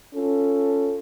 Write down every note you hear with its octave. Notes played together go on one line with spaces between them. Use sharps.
C#4 F4 A4